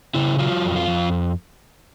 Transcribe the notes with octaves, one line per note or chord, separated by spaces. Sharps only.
C#3 E4
F#3 F4
F2
F4
F2